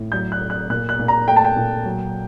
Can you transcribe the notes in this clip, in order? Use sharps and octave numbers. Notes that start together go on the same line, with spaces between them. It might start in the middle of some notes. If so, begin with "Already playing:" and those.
Already playing: A2
F#3 G6
F#6
A3
F#6
A#2 F#6
F#6
A#2
A#5
A3 G5
A5
G5
A#2
F#3